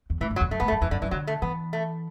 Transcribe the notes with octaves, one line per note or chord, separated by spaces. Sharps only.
E2
A2 E3
F#2
F#3
E2
F#2 A3
A2 B3
A3
F#2
E2 E3
F#2 D3
F#2 E3
D3 F#3
A3
E3 B3
A3